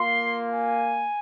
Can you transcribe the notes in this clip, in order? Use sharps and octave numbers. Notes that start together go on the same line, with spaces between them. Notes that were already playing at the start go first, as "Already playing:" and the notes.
Already playing: A#3 F4 C6
G#5